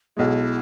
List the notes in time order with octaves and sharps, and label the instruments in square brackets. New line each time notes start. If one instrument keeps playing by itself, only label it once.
[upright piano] B1 B2 G#3 [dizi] E4